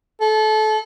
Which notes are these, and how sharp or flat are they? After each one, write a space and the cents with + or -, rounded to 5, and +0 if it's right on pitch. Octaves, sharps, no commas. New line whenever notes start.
A4 -25